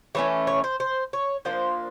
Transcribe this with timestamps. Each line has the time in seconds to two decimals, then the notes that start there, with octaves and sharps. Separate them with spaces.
0.15 E3 A3 C#4 C#5
0.47 C#5
0.64 C5
0.80 C5
1.13 C#5
1.45 F3 A#3 D4 C5